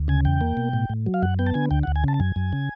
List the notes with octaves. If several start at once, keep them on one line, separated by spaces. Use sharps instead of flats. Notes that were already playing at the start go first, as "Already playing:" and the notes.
Already playing: D2
C#3 G#5
E2 G5
A#3
B2
A2
A2
F#3
F5
F#2 F#5
B3 G5
A5
D3 G#5
D2 G5
F#5
D2
G#5
C#3 A5
A5
F#2 G#5
F#2
C#3